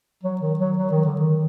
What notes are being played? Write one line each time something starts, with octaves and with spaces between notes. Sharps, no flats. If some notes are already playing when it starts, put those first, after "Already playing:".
F#3
D#3
F#3
F#3
D#3
D3
D#3